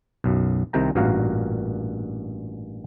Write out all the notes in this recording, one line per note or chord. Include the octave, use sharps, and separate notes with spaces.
B1 F#2
C2 C3 D#3 G5 A#5
A1 G2 A#2 F#4 A#4 F5